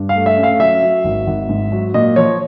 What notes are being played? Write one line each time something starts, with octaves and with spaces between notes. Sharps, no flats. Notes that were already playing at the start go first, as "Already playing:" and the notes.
Already playing: G2
F5
A3
E5
C#4
F5
F#3 E5
F#3
G#1
G#1
G#2
F#3
A#2 D#5
F3 C#5